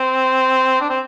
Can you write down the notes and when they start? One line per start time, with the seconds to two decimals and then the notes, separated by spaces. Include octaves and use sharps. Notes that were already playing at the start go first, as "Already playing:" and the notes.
Already playing: C4
0.81 D4
0.90 C4